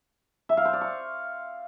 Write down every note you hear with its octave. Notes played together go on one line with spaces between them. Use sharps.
E5
F5
C5
D5
C#6